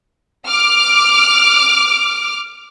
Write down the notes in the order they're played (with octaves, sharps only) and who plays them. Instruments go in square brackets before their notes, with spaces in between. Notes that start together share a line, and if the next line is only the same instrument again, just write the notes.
[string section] D6 F6